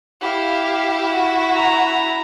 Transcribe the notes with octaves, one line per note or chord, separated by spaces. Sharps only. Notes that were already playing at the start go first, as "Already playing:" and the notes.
E4 G4 F5
F#4
A#5